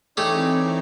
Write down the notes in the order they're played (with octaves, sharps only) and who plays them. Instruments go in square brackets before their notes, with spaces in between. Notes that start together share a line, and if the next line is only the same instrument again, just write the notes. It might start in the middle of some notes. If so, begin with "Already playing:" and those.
[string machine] E3 C4 [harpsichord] A3 G4 G#4 [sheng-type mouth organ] D#4 C#5 D5